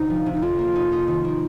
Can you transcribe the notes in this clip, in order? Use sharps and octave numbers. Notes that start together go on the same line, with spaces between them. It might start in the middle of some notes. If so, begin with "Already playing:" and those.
Already playing: D2 C3 D#4
F3
C3
D#4
F2 F4
A#3
D#4
D#4
D#3
A#3